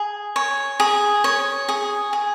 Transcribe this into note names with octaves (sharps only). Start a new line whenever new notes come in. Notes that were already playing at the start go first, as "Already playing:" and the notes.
Already playing: G#4
C#5
G#4
C#5
G#4
G#4